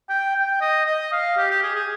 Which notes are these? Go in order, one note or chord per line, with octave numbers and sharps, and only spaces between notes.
G5
G5
D#5
D#5
F5
G4
G4
G#4
G#4